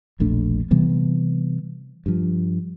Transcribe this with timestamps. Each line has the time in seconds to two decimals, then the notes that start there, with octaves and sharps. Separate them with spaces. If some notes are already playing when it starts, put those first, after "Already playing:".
0.20 E1 A#1 A3 D4
0.71 C3 E3 G3 B3
2.06 G2 F3